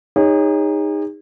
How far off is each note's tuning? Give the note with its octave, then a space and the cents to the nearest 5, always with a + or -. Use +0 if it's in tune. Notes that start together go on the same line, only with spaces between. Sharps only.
D#4 +0 G#4 -40 C#5 +0